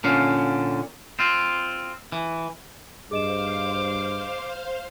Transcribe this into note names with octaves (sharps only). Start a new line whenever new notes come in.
A#2 D3 C#4 F5
C4 F4
E3
G2 G#4 C5 D#5 F5 D6 E7